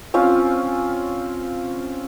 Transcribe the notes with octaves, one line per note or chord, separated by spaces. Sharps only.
C4 C#4 F4